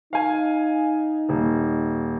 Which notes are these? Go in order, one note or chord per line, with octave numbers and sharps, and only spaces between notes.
D#4 F5 G#5
D#1